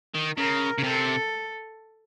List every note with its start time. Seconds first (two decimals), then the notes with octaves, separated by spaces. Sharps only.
0.15 D#3
0.37 C#3 A#4
0.78 C#3
0.83 C3 A4